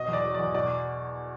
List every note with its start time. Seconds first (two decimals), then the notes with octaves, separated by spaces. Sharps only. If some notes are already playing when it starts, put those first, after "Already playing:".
Already playing: B2 D#5
0.08 E2
0.13 D5
0.23 F#3
0.34 E2 D5
0.55 B2 D5